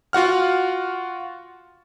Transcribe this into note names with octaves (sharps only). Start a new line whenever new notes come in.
F4 F#4 F#5 F6